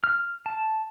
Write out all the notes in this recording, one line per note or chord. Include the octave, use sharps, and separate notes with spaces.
F6
A5